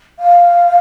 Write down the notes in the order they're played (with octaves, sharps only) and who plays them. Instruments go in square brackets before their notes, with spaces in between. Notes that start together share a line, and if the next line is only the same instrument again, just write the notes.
[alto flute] F5